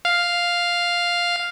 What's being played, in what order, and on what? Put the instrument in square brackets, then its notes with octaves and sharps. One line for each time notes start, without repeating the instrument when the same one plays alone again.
[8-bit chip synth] F5